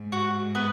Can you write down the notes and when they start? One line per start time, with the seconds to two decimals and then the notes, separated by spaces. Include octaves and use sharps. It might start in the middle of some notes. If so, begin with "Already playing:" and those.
Already playing: G#2
0.12 F#4
0.55 B3 B4